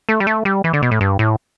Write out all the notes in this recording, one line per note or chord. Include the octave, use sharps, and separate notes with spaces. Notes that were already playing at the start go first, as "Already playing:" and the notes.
A3
G3
A3
G3
E3
D3
B2
A2
G2
A2